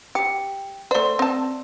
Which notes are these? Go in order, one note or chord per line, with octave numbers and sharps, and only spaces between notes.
G4 C#7
A3 C5 D5 C6
C4 A5